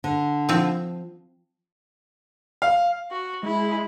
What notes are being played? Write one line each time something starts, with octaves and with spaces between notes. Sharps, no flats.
D3
F3 C4
F5
F#4
G#3 E4